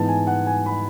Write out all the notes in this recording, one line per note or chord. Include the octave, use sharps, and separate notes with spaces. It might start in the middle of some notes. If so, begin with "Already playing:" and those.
Already playing: G#2 E3 B3 A5
G#5
F#5
G#5
B5